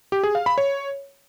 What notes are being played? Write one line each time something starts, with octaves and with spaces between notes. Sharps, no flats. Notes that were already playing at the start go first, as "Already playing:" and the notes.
G4
G#4
F5
B5
C#5